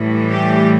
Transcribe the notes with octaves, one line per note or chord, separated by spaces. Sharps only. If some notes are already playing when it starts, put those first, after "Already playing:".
Already playing: A2 E3 G3
G4